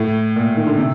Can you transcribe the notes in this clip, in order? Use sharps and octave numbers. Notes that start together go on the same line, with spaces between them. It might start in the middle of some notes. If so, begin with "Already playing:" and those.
Already playing: A2
A#2
D#3
D3
C3